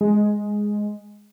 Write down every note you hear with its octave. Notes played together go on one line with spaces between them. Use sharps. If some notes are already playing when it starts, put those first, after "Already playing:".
G#3